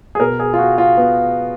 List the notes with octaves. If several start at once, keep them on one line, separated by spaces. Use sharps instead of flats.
G#4
B2 A#4
G#4
F4
F#4
F4
B3